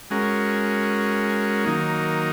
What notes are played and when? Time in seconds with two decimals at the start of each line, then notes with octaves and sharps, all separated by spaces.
0.10 G#3 C#4 F#4 A#4
1.65 D#3 F#3 A#3 D#4